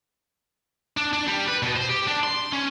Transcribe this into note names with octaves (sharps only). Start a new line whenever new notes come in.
D4
D4
G3
B4
B2
C5
G4
D4
C6
C#4